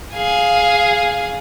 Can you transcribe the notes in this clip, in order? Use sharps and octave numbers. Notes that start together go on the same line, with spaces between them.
G#4 F5